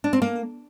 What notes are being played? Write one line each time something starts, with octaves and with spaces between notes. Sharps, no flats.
D4
C4
A#3